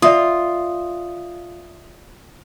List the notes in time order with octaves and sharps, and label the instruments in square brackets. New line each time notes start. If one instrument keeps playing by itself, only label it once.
[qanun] F4 [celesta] D5 E5 D#6